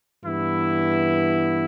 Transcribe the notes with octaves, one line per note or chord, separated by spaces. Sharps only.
G2 E3 B3 E4